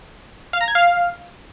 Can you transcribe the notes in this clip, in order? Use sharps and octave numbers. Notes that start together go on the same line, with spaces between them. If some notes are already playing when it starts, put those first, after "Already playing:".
F5
A#5
G#6
F5